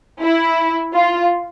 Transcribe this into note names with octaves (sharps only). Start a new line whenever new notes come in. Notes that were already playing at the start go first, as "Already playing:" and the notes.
E4
F4